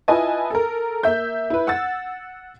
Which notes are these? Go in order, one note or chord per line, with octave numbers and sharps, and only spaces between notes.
E4 F4 B4 D#5 G#5 A5
A4 A#4
A#3 E5 G6
E4 B4
F#5 E6 A6